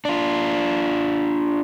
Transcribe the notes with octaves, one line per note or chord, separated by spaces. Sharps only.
D4 F4